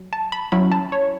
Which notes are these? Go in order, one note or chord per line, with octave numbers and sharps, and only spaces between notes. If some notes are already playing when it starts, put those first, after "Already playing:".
Already playing: F#3
A5
B5
F#3 C#4 E4 B5
A5
C#5